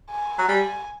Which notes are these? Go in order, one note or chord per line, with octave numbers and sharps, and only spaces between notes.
G#5
F#3
G3 G#5